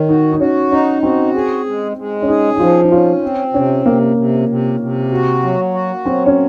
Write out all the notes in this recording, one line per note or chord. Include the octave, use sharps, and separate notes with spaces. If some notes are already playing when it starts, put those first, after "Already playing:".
Already playing: D#3 C#5
D#4 F#4
D#4
C#4 F#4
C#4 D#4
C4 F#4
G#4
G#3
G#3
C#4
D#4 G#4
D#4
F3 F4
D#4
C#4 F4
C4
C3 C#4
C3 A#3
C3
C3
C3
F#4
F#3
F#4
F#3 C4
C#4